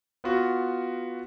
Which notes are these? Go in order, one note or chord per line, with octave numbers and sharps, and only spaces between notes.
B3 F4 F#4